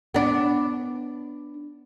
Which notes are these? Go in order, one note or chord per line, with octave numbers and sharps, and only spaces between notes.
B3 D4